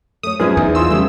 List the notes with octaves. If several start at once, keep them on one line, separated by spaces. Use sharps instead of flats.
A3 C#5 D#6
F#2 F3 G#4 B4 D5 E5
E2 D#4
F4 C6 D#6 E6
C#3 G3 A3